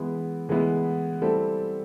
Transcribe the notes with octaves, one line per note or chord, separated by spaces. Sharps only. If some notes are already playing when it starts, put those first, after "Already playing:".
Already playing: E3 G#3 B3 E4
E3 G#3 B3 E4
G3 C4 E4 A4